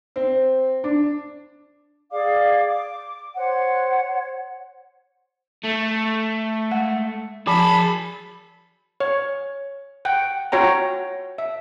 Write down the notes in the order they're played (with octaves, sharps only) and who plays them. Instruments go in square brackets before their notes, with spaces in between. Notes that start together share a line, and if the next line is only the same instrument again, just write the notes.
[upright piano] C4
D4
[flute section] G#4 D5 F5 D6
D6
C5 C#5 F#5
[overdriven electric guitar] A3
[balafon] G#3 F#5
[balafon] F3 [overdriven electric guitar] G#4 A5 [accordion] B5
[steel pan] C#5
F#5 G5
F4 F#4 C#5 G5 A#5
E5